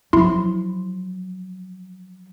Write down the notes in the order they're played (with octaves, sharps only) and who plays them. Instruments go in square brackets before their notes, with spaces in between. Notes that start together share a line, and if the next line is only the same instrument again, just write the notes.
[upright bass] F3 F#3 [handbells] E4 C6